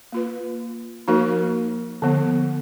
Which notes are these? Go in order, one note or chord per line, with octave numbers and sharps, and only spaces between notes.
A#3 F4 B4
F3 A#3 D#4 F#4 A#4
D3 F3 B3